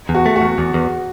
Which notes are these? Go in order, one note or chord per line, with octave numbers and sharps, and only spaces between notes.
E2
F#4
A3
F#4
E2
E2
E2